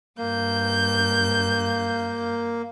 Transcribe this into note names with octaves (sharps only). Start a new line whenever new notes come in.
G2 A#3 G6